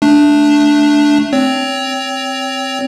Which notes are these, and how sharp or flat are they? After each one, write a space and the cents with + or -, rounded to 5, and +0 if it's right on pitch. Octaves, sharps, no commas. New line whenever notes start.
A3 +0 D4 +0
C4 +0 C#5 +20